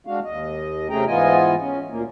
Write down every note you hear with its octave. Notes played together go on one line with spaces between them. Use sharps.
G#3 D4 F#4 F5
D#2 D#5
C3 A3 C#4 G#4 G5 A#5
G#2 E3 B3 F4 D#5 G#5
C#4
D2 A#2 A#3